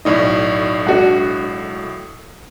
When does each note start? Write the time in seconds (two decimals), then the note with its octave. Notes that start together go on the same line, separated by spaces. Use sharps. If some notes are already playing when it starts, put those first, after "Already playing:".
0.05 B1 A2 D#4 D5 D#5 C#6
0.87 G#3 D4 F#4 F#5